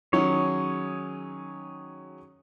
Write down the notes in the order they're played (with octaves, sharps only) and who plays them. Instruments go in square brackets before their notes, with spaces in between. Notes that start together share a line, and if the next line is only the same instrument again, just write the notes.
[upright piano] D#3 F#3 C#4 [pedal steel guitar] G#4 C#5